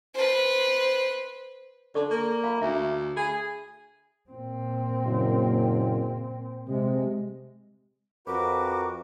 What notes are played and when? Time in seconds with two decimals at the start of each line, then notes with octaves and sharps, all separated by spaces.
0.14 B4 C5
1.95 D3 A4 D5 C#6
2.11 A#3
2.44 F5 A#5 B5
2.62 D2 E5
3.17 G#4 B5
4.30 A#2 C4
5.05 F#1
6.68 C3 G#3
8.27 F2 F#4 A#4 B4 D6